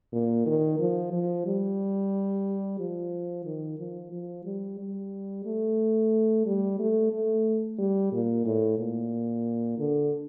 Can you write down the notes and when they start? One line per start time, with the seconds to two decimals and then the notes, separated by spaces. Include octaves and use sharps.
0.13 A#2
0.46 D#3
0.80 F3
1.13 F3
1.46 G3
2.79 F3
3.45 D#3
3.79 F3
4.12 F3
4.45 G3
4.79 G3
5.45 A3
6.46 G3
6.79 A3
7.12 A3
7.79 G3
8.12 A#2
8.45 A2
8.79 A#2
9.79 D3